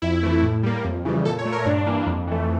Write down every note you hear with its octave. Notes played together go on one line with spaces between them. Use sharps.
F2 E4
E3 A3
A2
G3 A#3
F2
C#3 E3 G3
A#2 A4
C#5
A3
A#4
G2 D4
E3 A#3
F2
E3 A3